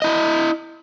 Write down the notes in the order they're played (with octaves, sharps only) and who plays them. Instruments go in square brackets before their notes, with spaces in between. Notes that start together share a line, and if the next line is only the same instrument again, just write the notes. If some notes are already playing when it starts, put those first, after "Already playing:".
[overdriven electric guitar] E4 D#5